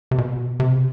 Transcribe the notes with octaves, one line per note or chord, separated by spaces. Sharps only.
C3
B2
C3